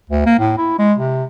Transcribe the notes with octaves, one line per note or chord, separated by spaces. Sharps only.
D2
A#3
A2
E4
G#3
C3